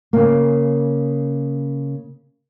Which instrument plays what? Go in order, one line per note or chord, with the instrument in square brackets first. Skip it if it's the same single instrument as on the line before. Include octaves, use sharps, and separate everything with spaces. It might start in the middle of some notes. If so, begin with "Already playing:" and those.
[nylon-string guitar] C#3 A#3